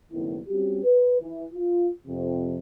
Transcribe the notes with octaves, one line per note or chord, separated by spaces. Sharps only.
F#1 C2 A2 D#3 B3 E4
G3 C4 C#4 F#4 G4
B4
E3
F4
F2 C3